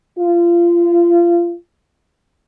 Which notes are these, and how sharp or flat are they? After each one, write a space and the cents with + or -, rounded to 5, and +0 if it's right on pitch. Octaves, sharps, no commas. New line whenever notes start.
F4 -25